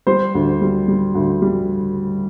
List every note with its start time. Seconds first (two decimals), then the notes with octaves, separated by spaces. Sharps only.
0.07 G3 C5
0.35 D2
0.61 G3
0.88 G3
1.15 D2
1.42 G3